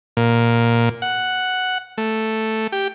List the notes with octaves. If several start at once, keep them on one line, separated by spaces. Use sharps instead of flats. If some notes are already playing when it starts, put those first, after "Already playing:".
A#2
F#5
A3
G4